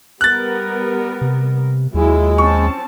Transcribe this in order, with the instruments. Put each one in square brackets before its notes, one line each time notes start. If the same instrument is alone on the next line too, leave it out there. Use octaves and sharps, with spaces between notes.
[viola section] G3 B3 A#4 [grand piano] F#6 A6
[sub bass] C3
[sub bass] D#2 [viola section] F#3 E4 F4 [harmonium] G#3
[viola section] C4 C#4 A5 [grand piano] C#6